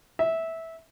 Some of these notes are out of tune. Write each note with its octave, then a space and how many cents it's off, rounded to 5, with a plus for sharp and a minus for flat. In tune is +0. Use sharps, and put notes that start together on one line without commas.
E5 -15